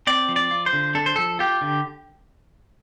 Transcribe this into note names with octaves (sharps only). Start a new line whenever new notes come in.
C4 D5
F3
D5
F4
C5
D3
D4 A4
C5
F3 A4
F4 G4
D3